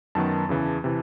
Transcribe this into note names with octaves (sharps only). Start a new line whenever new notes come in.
F#2 D#3 F#3 B3 A5
E2 C#3 E3
C3 E3